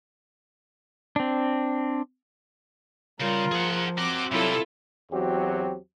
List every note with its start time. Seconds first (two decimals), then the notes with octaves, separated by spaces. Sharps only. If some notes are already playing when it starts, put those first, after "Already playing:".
1.16 C4 D4
3.21 C#3 G3 F4 A#4
3.52 F3 G#4 F#5
3.98 C4 F#4 A#4 D6
4.31 C3 F#3 G3 E4 F4 A4
5.11 E2 F#3 C4 F#4 G4